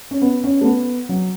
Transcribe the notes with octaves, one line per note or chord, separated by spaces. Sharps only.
C#4
B3
C#4
A3
B3
F#3